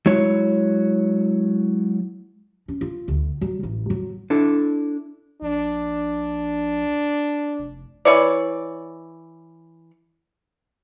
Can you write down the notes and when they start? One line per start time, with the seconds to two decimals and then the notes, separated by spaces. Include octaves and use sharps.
0.06 F#3 G#3 E4 C#5
2.68 C#4
2.81 F4
3.08 D2
3.41 F#3
3.63 A1
3.90 F#3
4.30 D4 E4 A4
5.42 A#1 D4
7.59 F1
8.05 E3 C#5 D5